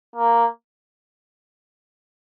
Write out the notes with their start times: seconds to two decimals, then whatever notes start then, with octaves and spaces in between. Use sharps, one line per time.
0.16 A#3